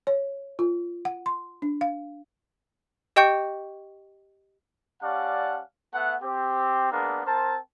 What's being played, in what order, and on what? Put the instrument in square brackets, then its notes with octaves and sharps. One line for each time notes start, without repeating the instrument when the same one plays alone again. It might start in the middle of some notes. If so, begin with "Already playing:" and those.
[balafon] C#5
F4
F#5
C6
D4
F5
[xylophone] G4 D#5 G5 C#6 G6 C#7
[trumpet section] G3 C#4 D5 F5 F#5 A5
A3 B3 E5 F#5
C4 G4
G#3 A#3 B3 D4
C4 A#4 C5 A5